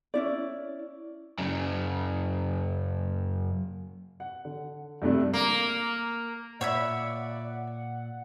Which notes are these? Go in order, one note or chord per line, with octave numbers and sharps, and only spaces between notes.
C#4 E4 D5
F#2 C#3
F#5
D3
G2 C3 A3 D4
A#3
A#2 C#5 D5 E5 F#5 B5